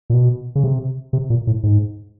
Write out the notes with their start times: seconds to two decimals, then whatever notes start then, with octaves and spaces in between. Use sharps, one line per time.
0.10 A#2
0.14 B2
0.55 C#3
0.64 C3
1.13 C3
1.30 A#2
1.47 A2
1.63 G#2